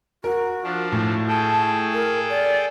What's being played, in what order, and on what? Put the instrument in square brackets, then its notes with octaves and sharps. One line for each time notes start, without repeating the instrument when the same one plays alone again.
[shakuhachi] F#4 [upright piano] A#4
[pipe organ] F3 D4
[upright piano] A2
[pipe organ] G#4 A4 G5 [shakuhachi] A5
[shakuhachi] A#4
D5